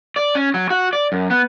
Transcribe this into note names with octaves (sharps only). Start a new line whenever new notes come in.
D5
C#4
F#3
F#4
D5
F#2
B3